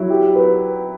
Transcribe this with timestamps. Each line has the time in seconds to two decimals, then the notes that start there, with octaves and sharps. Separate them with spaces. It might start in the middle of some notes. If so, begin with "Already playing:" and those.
Already playing: F#3 E4
0.10 G4
0.36 B4